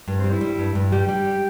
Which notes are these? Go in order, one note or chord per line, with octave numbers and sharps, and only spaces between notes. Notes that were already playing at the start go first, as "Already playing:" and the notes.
G2
C4
G3
E4
G3
G2
G2
G3 G4
G3